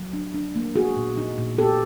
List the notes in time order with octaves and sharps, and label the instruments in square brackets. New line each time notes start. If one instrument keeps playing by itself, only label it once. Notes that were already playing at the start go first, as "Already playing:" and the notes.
Already playing: [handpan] F#3
D4
D4
A#3
B3 F#4 G#4
A#2
D#4
A#2
B3 G4 A4